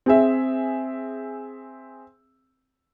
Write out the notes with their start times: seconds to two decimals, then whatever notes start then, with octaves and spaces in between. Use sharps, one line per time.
0.06 C4 G#4 E5